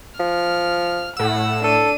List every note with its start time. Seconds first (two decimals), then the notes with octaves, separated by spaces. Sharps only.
0.20 F3 F6
1.17 A2 F#5 E6
1.64 D4 A4 D#7